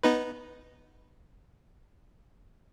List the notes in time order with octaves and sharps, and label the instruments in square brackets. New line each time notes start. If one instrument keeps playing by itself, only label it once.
[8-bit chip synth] B3 D#4 B4